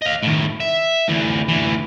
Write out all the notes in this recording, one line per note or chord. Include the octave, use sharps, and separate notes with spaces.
D#5 F5
A2 D#3
E5
D2 E3
D2 E3